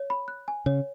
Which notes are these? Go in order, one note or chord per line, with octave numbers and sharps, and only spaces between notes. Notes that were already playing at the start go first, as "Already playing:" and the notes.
Already playing: C#5
B5
F#6
G#5
C#3 C#5